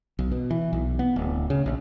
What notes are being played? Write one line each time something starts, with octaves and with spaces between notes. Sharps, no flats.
B1
B2
E3
B1
B3
D1
C#3
A#1